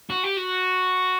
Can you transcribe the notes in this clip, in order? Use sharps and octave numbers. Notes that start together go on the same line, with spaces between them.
F#4
G4
F#4